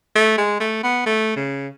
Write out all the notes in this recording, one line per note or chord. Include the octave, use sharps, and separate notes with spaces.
A3
G#3
A3
B3
A3
C#3